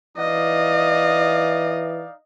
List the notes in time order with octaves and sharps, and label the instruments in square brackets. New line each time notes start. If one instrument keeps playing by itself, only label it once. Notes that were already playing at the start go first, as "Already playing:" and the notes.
[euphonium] E3 [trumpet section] D#4 D5 F5 [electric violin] D#5